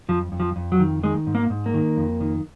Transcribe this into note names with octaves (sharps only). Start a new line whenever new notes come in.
F2 F3
F2
F3
F2
F#3
D#3
D#3 G#3
G#2
A#3
G#2
A#3
D#3
F2
D#3